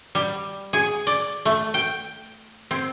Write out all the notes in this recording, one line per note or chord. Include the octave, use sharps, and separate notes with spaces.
G3
G#4
D5
A3
G5
C4